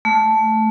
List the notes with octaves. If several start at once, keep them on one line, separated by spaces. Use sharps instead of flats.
A3